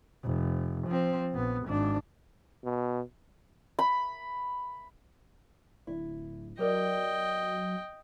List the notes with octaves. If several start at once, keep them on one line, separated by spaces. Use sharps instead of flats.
F1
F3 C4
A#1 B3
G#1 D4
B2
B5
D1 E4
F#3 G4 A#4 D5 D#5 G5